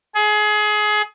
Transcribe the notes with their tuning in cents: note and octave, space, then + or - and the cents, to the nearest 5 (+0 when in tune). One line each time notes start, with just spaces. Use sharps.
G#4 +25